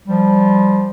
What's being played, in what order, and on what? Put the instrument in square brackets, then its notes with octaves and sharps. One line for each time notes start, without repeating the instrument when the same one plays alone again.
[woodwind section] F3 G3